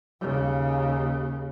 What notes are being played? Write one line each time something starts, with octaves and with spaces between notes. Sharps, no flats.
D#2 C#3